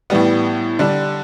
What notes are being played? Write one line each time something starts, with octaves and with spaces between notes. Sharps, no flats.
A2 E3 G3 B3
D3 G3 D4